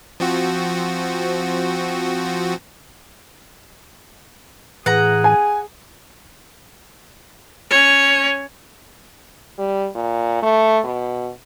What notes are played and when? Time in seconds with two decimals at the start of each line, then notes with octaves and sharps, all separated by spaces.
0.20 F3 C4 F#4
4.86 A2 E3 G#4 F#5 A#5
5.24 G#5
7.70 C#4 C#5
9.59 G3
9.95 A#2
10.42 A3
10.84 B2